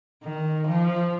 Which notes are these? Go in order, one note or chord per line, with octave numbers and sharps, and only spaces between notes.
D#3
F3